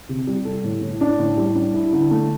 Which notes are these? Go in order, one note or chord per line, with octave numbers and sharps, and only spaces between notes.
C3
G3
A4
A2
A2
D4
A2
G3
D4
E4
D3
A3